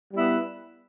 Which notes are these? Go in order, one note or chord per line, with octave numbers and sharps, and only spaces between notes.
G3 B3 E4 B4